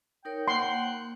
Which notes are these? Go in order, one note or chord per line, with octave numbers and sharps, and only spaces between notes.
D#4 A#4 C#5 G5
A#3 F#5 C6